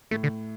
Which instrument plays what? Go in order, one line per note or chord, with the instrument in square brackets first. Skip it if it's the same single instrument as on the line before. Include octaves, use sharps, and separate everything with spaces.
[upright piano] A2 [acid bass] A3
[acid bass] D3